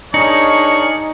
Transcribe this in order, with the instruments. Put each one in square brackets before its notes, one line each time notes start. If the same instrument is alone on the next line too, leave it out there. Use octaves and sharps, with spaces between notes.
[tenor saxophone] D4 [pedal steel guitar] D#4 [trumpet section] G#4 A#4 C#5 [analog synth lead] C#7